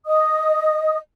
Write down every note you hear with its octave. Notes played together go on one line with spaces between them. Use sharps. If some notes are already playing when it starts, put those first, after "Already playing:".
D#5 D#6